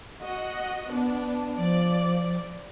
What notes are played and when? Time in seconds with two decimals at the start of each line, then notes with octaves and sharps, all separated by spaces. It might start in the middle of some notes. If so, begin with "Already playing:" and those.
0.21 F#4 D#5 F#5
0.91 B3 D4
1.58 F3 D5